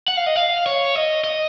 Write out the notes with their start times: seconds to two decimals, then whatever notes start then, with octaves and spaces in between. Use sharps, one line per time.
0.08 F#5
0.17 F5
0.26 D#5
0.36 F5
0.66 C#5
0.95 D#5
1.24 D#5